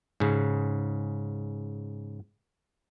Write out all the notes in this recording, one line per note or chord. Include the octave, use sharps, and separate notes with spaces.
G#2 C#3